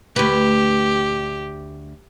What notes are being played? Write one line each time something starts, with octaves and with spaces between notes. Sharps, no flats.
D2 G4 B4